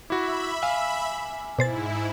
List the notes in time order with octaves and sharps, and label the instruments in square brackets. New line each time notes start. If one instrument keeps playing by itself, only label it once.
[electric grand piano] E4 F#4 [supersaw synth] E5 B5 [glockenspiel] D6
[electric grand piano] F5 [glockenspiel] G#5
[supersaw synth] G#2 E4 [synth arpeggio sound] B2 C5 A6